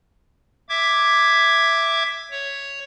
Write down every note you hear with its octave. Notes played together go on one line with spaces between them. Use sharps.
E5 D6 G#6
C#5